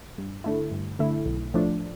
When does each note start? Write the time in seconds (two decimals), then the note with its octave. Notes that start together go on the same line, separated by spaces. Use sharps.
0.18 G2
0.44 D3 A3 E4
0.71 G2
0.99 D3 A3 E4
1.26 B1
1.54 A2 F3 A3 D4